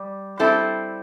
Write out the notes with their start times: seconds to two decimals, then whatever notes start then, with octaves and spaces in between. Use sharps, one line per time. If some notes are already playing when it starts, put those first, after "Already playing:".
Already playing: G3
0.39 G3 C4 E4 A4